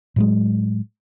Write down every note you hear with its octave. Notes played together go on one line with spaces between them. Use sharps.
A2 F#3 G#3